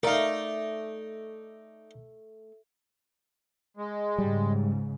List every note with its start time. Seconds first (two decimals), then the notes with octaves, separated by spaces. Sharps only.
0.03 A3 D#4 A#4 D5 F5
3.77 G#3
4.18 G#2 C#3 G3